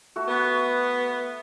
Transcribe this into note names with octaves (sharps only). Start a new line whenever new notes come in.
A3 F#4 A4
B3